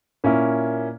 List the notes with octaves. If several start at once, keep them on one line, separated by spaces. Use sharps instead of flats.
A#2 A#3 C#4 E4